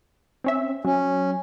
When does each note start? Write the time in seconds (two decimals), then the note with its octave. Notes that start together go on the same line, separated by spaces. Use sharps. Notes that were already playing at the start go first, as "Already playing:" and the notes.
0.44 C4 C#4 E5
0.85 F#3 C#4